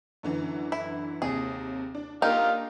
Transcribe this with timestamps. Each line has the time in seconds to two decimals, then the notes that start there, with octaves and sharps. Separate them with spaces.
0.23 F#2 D3 E3
0.72 E4
1.22 D#2 C3 G#4
1.95 D4
2.22 A#3 D4 D#4 F4 G4 A#4 F5